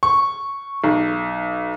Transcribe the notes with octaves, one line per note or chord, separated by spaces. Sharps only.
C#6
B1